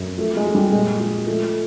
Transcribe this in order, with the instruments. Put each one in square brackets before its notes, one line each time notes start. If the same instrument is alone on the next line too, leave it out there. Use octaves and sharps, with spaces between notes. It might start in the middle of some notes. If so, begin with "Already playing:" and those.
Already playing: [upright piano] F#2
F3 A3
G#3
F3
G3
A#2 G#3
F3 G#3
F3 A3